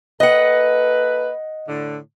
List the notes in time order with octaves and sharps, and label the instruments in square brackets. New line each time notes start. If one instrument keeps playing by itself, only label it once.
[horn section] A#3 A4 B4 [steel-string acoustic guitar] D#5 F#5
[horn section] A2 D3